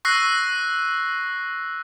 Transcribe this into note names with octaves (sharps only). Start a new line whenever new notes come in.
C#6 E6 F#6 A#6 C7